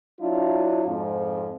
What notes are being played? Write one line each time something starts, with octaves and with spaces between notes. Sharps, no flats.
F#3 D4 E4 F4
F2 G#2